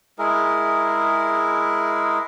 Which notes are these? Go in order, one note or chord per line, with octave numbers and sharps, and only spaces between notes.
G#3 E4 G#4 A#4